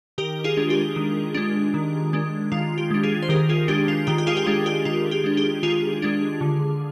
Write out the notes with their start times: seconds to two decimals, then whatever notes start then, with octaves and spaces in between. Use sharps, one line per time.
0.18 D#3 G4 A#4
0.44 F4 G#4
0.57 G#3 D4
0.70 G4
0.96 D#3
1.34 G#3 D4
1.74 D#3
2.13 G#3 D4
2.52 D#3 F4
2.78 G4
2.91 G#3 D4
3.03 F4 G#4
3.22 C5
3.29 D#3 G4 A#4
3.49 F4 G#4
3.68 G#3 D4 G4
3.88 F4
4.07 D#3 G4
4.18 G4
4.27 F4 G#4
4.37 G4
4.46 G#3 D4 F4
4.66 G4
4.85 D#3 F4
5.11 G4
5.24 G#3 D4
5.37 G4
5.63 D#3 F4 G#4
6.02 G#3 D4
6.41 D3